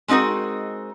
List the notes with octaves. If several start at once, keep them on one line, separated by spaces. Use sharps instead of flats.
G#3 C4 D#4 F#4 A#4